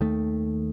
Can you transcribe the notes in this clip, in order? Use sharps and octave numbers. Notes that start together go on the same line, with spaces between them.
D#2 D#3 A3